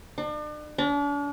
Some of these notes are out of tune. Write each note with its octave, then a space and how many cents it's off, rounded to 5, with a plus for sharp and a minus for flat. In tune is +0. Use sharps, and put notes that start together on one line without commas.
D4 +40
D4 -40